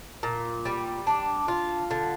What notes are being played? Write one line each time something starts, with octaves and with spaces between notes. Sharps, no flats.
A#2
G3
D4
F4
D3